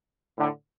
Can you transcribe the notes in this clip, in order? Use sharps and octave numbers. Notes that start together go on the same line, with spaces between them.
A2 D3